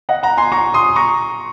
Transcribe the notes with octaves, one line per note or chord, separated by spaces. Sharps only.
D#5 F#5
F#5 A#5
G#5 C6
A#5 C#6
C6 D#6
A#5 C#6